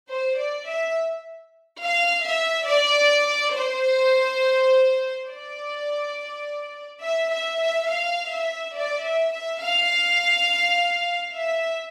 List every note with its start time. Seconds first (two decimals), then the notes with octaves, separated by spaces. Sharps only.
0.10 C5
0.39 D5
0.68 E5
1.83 F5
2.26 E5
2.69 D5
3.57 C5
5.30 D5
7.03 E5
7.32 E5
7.61 E5
7.89 F5
8.33 E5
8.77 D5
9.05 E5
9.33 E5
9.63 F5
11.36 E5